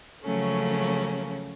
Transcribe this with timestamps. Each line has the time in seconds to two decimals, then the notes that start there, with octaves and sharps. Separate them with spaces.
0.23 C#3 F3 F#3 A3 A#3 C#4